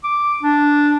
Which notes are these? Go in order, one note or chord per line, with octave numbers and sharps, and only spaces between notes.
D6
D4